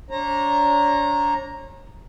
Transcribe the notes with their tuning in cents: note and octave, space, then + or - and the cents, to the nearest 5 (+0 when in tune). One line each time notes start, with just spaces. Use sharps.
D4 -35 C#5 -40 A#5 +0